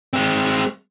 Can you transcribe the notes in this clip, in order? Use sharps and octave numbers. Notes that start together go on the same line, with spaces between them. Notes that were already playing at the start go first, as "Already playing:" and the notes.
G#3 C4